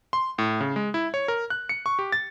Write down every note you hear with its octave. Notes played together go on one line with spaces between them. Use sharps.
C6
A2
C#3
G#3
E4
C#5
A#4
F#6
C#7
C#6
G4
A6